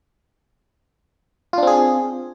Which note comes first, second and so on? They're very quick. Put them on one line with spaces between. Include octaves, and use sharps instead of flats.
F4 D4 C4 G#4